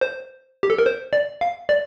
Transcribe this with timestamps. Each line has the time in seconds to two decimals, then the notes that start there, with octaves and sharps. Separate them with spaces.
0.01 C5
0.63 G4
0.70 A4
0.78 A#4
0.86 C5
1.13 D5
1.41 F5
1.69 D5